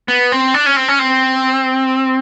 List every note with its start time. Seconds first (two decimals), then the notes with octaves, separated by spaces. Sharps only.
0.08 B3
0.32 C4
0.54 D4
0.66 C#4
0.76 C4
0.88 C#4
0.99 C4